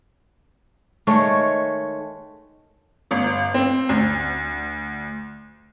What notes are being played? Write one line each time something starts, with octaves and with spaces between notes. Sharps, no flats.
D#3 G#3 A3 C#5
G1
C4
D2